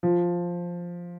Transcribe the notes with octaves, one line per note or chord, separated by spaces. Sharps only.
F3